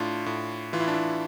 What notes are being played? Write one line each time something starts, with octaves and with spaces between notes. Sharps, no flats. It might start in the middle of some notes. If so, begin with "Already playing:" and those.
Already playing: A2 D4 F4
A2
E3 F4
E4
D4
E4